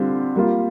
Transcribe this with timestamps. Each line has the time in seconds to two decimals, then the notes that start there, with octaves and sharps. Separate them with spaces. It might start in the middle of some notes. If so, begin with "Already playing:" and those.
Already playing: D3 G3 C4 F4
0.36 G3 A#3 F4